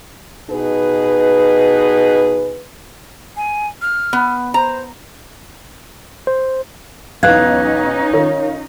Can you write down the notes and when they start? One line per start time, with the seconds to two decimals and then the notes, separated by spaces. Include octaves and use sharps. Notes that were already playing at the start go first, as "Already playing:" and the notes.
0.51 B2 D#4 G#4 B4
3.37 G#5
3.82 F6
4.13 B3
4.54 C5 A#5
6.27 C5
7.23 B1 E2 C#4 D#4 B4 F5 F#6 G#6
8.14 D#3 F4 C#5